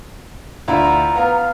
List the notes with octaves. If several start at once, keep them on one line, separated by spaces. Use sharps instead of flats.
D2 E4 F4 D5 A#5
B3 F5